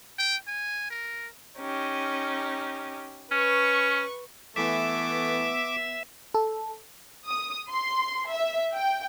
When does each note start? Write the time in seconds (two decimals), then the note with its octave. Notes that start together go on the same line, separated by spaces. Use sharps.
0.19 G5
0.48 G#5
0.91 A#4
1.58 C#4 D#4 G4
3.32 C#4 B4 C#6
4.56 E3 A3 B3 E5 D6
6.34 A4
7.28 D#6
7.71 C6
8.31 E5
8.74 G5